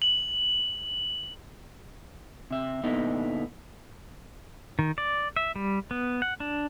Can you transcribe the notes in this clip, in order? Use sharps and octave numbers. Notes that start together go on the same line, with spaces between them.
F#7
C3 E5
A#2 D3 B3 D#4 E4
D#3
D5
E5
G3
B3
F#5
D4